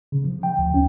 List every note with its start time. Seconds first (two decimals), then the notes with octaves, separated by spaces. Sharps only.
0.12 C#3
0.24 F3
0.43 G5
0.58 D2
0.74 C#4